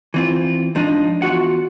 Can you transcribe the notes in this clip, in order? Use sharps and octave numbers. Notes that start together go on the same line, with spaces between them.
E3 C4 F4
G#2 F3 D4 D#4
E2 F4 F#4 F#5